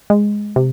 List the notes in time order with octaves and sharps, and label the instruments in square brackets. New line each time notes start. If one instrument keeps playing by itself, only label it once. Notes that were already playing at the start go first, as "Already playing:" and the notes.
[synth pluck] G#3
C3